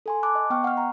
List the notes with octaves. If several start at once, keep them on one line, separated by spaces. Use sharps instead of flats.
A4 G#5 C6
A5 D6 F#6
D#5
B3 G5 C#6 F6
F#5 F6
A#5